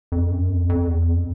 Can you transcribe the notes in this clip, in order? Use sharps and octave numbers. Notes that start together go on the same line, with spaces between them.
F2
F#2
F2
F2
E2
F2